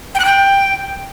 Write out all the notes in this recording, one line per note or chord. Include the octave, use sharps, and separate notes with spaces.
G5
F#6
G5